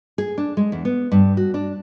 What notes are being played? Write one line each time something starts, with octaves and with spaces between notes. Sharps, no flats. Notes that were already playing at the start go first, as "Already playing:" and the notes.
G#4
D4
G#3
E2
B3
G2
F#4
D4